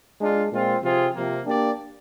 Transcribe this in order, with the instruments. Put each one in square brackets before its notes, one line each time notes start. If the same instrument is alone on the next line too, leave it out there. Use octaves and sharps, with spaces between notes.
[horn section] G#3 D4 F4
A#2 G#3 C4 F4
C3 F3 C4 F4 G#4
C3 F3 A#3
A#3 D4 G4 D5